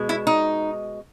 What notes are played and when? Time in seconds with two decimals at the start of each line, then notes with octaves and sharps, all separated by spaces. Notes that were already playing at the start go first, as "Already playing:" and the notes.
Already playing: B2 G#3
0.09 E4
0.27 D#4